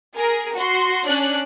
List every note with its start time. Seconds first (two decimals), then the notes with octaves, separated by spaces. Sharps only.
0.15 G#4 A#4
0.55 F#4 C6
1.05 C#4 D4 F#6